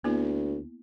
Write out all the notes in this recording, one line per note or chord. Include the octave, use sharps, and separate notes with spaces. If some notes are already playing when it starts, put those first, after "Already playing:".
D2 A#3 B3 E4